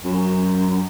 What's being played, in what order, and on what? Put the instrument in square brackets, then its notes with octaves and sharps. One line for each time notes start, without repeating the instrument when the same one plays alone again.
[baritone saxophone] F#2